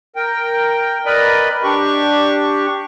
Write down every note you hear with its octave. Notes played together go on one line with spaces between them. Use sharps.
A#4 G5
A#4 B4 D5 D#5 B5
D4 G4 C#6